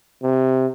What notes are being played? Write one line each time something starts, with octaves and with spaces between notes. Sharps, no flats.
C3